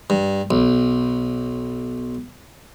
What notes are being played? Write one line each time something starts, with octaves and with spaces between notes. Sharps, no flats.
G2
B1